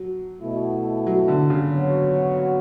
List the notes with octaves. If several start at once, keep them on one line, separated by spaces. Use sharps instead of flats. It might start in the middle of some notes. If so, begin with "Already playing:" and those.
Already playing: F#3
B2 A3 E4
F#3
D3
C#3
F#3 B3 F#4 C#5